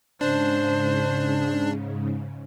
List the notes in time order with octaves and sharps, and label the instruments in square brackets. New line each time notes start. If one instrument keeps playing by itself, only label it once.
[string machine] G#2 C#3 [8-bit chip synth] D4 [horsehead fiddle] C5